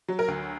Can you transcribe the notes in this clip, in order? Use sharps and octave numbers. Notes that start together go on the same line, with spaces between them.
F#3
A#4
D2